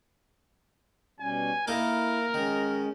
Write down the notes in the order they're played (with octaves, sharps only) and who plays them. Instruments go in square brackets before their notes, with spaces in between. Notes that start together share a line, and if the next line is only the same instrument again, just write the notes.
[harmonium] B2 G3 C#4 [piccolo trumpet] G#5
[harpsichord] A#3 D#4 A4 [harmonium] E4 [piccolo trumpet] A#4
[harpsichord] D#3 [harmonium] G#3 C#4